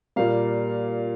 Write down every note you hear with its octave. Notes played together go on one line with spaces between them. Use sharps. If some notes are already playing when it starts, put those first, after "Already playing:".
A#2 G3 A#3 F5